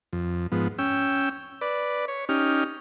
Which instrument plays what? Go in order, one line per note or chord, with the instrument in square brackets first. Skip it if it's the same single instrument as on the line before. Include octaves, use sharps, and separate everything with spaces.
[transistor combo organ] F2
G#2 F3 B3
C#4 G5 E6
B4 D5
C#5
C#4 D#4 G4 F6